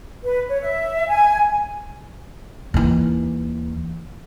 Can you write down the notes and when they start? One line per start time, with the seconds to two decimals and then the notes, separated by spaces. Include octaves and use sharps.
0.23 B4
0.49 C#5
0.61 E5
1.07 G#5
2.74 D#2 E3